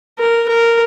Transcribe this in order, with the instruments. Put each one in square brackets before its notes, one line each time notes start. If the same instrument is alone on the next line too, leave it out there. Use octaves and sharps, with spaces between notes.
[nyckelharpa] A#4
A#4